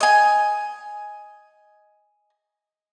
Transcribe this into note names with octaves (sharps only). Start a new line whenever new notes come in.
D#5 G#5